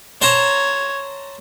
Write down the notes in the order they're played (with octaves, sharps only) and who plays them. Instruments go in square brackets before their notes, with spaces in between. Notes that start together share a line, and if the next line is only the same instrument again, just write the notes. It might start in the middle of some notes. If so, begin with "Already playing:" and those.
[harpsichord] C5 A5 A#5 [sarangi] C#5